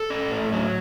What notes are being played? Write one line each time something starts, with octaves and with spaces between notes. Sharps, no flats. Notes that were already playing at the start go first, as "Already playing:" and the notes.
Already playing: A4
C#4
A2
F#3